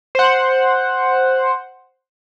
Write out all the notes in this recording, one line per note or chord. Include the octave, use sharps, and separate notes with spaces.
C5 F#5